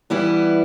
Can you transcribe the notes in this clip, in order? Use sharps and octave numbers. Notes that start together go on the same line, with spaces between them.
E3 G3 B3 E4